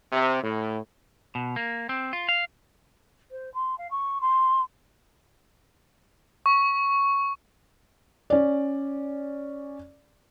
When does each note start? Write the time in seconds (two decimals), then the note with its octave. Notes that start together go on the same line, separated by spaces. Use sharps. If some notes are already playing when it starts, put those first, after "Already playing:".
0.12 C3
0.42 A2
1.35 B2
1.56 A#3
1.89 C4
2.13 F4
2.29 F5
3.31 C5
3.54 C6
3.78 F5
3.91 C#6
4.21 C6
6.46 C#6
8.30 C#4 D5